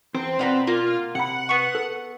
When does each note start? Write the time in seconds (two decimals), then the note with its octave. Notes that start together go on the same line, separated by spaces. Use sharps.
0.14 E2 C4 C5
0.39 B2 F4 B4 D5 F#5 A#5
0.67 A#3 F4
1.15 C3 F#5 B5
1.49 B3 C#6
1.75 A4